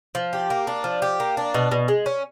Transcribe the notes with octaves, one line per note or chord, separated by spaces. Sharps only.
F3
G4
A#3
D4
F3
G4
A#3
D4
B2
B2
G#3
C#4